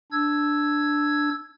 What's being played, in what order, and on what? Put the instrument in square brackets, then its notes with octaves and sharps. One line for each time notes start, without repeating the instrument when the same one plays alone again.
[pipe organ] D4 E6 G#6